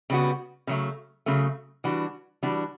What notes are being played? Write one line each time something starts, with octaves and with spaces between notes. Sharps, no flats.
C#3 G3 B3 F#4
C#3 F#3 A3
C#3 F#3 A3
E3 G3 D4 F#4
E3 G3 D4 F#4